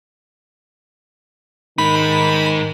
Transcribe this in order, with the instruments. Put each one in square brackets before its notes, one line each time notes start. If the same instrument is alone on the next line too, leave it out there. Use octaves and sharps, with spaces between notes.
[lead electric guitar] G#2 D#4 [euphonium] D#3 [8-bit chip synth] B5